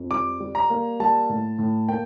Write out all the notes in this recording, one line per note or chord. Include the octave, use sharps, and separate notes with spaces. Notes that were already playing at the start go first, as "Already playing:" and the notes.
Already playing: F2
G3 D6
G3
A#5
A#3
G3 A5
A2
A2
A#3 G5